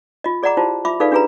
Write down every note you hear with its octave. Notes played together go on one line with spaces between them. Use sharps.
F4 D#5
G#4 D5 D#5 F#5 A#5 D6
E4 F4 G4 C5 A5
F4 E5 B5 D6
D#4 G#4 A4 B4 D5 F5
D4 F4 G4 G#4 B4 A#5